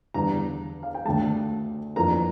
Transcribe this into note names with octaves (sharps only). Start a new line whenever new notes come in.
E2 D3 G3 D4 A#5
F5
G5
D2 D3 A3 A5
F2 E3 A#3 D4 A#5